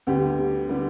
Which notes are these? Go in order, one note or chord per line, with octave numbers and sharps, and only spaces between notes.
D2 D3 G3 B3 G4
D3 G3 B3